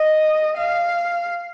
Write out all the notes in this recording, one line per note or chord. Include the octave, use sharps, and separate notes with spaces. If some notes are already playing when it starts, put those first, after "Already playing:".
Already playing: D#5
F5